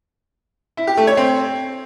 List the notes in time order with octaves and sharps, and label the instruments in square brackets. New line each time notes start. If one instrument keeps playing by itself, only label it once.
[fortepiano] E4
G4
A3
C#5
C4